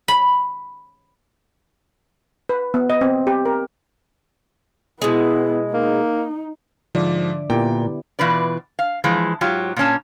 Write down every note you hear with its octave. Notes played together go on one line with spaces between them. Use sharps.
B5
B4
B3
D#5
C4
G4
A#4
B2 G#3 B3 E4
A#3 D#4
G#2 D3 F3 D5 E5
A#2 B3 E4 G4 G5
B2 E3 F4 B4 D5
F5
E3 F3 G#3
G#2 F#3 F4 G4
A#2 A#3 C#4 A5